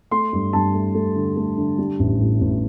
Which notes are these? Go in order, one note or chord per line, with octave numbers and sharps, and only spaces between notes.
A3 C6
G2
G2 A5
A3
A3
D3
A3
D3
G3
A1
A2
A1